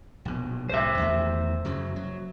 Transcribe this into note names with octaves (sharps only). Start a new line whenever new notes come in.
A#1 B2
C2 A2 C5 E5
E2 D#3 A3
F#2 C#3 F#3
F#3